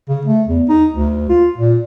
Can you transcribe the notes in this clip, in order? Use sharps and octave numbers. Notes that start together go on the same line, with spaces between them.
C#3
A3
E2
D#4
D2
F4
A#2